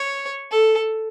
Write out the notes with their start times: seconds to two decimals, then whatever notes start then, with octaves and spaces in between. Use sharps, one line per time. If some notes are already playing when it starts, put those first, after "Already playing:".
Already playing: C#5
0.51 A4